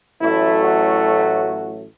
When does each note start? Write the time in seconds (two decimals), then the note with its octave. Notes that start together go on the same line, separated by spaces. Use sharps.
0.21 A1 A2 F#3 A3 E4
0.63 F#4